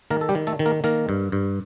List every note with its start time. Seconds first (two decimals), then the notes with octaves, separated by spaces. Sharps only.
0.10 D#3 A#3 A#4
0.21 A4
0.29 G3 G4
0.35 D#3
0.47 A3 A4
0.59 D#3
0.66 A#3 A#4
0.84 D#3 A#3 A#4
1.09 G2
1.32 G2